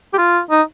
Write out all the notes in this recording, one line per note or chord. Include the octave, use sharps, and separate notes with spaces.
G4
F4
D#4